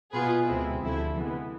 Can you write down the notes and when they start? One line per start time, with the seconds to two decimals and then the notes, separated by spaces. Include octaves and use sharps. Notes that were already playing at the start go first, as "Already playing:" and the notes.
0.12 B2 B3 F4 G#4 B4
0.47 D2 C3 G#3 C4 E4
0.82 D2 C3 F3 A3 E4
1.17 E3 G#3 B3